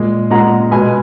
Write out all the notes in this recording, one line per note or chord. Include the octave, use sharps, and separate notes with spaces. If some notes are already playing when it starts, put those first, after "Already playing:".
Already playing: A#2 G#3
A#2 G#3 F#5 A#5
B2 G#3 G#5 B5